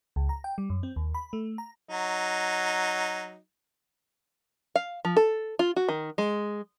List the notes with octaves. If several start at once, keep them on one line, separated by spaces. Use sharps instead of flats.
C#2
A#5
G5
G3
F#2
C4
D#2
B5
A3
A#5
F#3 D#4
F5
F3
A4
F4
F#4
D#3
G#3